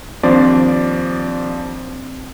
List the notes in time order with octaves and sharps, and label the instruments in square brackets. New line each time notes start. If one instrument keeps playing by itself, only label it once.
[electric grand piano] D#2 F3 D5 [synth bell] C4 D4 C5